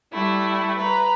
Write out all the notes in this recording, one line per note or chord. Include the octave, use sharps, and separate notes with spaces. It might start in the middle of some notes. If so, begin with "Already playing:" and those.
G3 A3 E4
B4 A#5